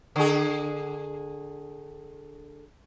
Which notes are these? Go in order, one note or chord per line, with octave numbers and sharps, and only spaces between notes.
D3 G#4